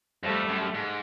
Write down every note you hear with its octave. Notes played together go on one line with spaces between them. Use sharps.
F2 G3 A3
F#2
G#2